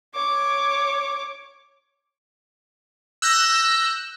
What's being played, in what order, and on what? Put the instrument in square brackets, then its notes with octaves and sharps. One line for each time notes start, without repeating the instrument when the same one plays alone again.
[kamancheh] C#5 D6
[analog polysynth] E6 F#6 G6 A#6